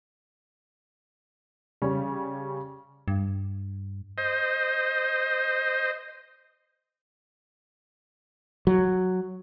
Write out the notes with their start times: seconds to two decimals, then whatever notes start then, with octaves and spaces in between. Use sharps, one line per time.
1.82 C#3 G3 C#4
3.08 G2
4.18 C5 D#5
8.67 F#3